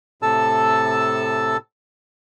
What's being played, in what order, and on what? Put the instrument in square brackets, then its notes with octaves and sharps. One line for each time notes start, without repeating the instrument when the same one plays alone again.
[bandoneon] A2 C3 A4 A5 E6